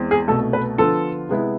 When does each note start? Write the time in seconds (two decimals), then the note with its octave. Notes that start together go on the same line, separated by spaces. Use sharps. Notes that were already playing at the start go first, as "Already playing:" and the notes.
Already playing: E2 G#3 C4
0.11 G#4
0.28 C2 B2 A3 A4
0.53 B4
0.78 D3 F3 B3 F4 A4
1.29 C3 G#3 B3 E4